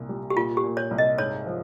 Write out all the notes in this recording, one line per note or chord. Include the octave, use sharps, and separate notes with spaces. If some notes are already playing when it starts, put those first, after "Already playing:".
Already playing: C2 A#2
G3
G4
A#2 F4
G4
A#2
C#5
C2
D#5
G#2 C#5
F3